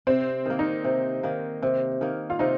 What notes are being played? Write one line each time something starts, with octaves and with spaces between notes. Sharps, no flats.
C3 C4
D#3 A#3
D#4
C3
D#3 A#3
C3
D#3 A#3
F4
C3 D#4